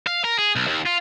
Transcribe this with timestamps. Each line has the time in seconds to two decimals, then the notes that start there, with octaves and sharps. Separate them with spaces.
0.07 F5
0.24 A#4
0.38 G#4
0.56 B1
0.67 D#2
0.86 F4